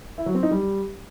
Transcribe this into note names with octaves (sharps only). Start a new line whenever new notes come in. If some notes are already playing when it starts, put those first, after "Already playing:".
E4
F#3
C4
D#4
G3